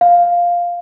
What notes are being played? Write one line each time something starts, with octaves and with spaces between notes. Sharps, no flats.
F5